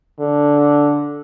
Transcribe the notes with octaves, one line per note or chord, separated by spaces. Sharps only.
D3